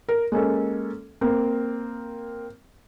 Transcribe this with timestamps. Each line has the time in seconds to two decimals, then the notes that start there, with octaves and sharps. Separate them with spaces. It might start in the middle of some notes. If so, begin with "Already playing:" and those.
0.09 A#4
0.32 G#3 A#3 C#4 A4
1.21 A#3 C4